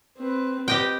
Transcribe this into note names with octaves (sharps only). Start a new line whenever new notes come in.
C4 B4
G4 B4 D#5 G5